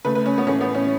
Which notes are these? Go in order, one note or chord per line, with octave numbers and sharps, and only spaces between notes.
C#3 A3 B4
B4
C#4
B3
A2 E3 A3 C#4
B3
C#4